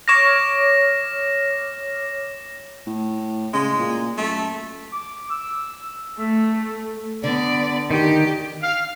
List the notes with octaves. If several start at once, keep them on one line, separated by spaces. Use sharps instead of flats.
C#5 D6 F6 A#6 E7
A2
C#3 G#3
A#2
F#2 A3
D6
E6
A3 E5
D3 B3 D5
D#3 G4
F5